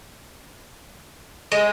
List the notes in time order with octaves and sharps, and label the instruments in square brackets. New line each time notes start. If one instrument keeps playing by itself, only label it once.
[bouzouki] G#3 [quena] D#5